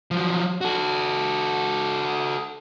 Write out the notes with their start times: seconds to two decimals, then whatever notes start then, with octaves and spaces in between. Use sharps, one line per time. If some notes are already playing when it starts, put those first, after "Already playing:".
0.11 F3 F#3
0.61 F#4 A4